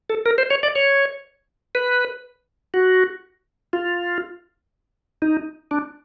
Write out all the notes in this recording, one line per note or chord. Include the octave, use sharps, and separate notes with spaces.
A4
A#4
C5
C#5
D5
C#5
B4
F#4
F4
D#4
D4